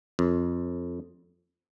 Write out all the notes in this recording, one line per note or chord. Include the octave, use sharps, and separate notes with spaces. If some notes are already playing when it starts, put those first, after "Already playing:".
F2